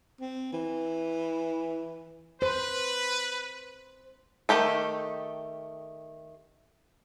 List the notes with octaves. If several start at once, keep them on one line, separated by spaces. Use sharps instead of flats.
C4
E3
B4 C5
D#3 A3 G4 A4